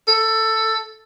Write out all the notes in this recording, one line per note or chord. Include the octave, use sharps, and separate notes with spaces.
A4